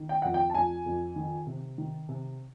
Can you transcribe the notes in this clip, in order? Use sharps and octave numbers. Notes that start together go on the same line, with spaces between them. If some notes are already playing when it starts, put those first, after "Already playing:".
Already playing: D#3
G5
F2 F#5
G5
A5
F2 G#5
F2
D#3
C3
D#3
C3